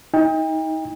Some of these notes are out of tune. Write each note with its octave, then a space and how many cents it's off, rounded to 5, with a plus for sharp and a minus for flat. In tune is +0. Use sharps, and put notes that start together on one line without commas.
D#4 +30 G5 +35